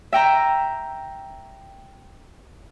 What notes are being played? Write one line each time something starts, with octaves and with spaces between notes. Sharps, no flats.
E5 G5 A#5